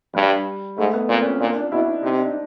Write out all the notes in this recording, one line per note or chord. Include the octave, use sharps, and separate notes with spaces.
G2 G3
G#2 A3
B3
A#2 C4
C#4
A#2 D4
D4
B2 E4
D#4
C3 D#4
D4
D4